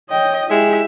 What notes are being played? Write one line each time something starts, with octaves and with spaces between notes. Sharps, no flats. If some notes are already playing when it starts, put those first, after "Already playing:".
C#5 D#5 G5
G#3 E4 G4 E5